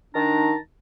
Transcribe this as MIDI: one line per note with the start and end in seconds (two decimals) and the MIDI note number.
0.14 0.55 51
0.14 0.55 62
0.14 0.55 63
0.14 0.55 81
0.14 0.55 82